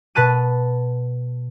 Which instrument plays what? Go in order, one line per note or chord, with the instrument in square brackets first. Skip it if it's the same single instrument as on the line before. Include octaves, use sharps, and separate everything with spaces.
[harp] B2 B4 A5 F#6 D#7